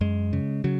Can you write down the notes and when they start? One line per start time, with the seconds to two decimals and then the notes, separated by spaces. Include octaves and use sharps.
0.01 F#2 G#3
0.33 C#3
0.64 C#3 F#3